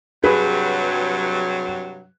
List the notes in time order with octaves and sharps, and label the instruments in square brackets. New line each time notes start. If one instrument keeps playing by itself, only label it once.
[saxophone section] G2 C3 F#3 [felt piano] G#4 B4